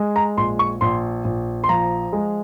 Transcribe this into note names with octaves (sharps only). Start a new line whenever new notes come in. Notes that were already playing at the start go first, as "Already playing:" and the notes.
Already playing: G#3
A#5
A#1 C6
C#6
A#1 C6
A#1
C6
F3 A#5
G#3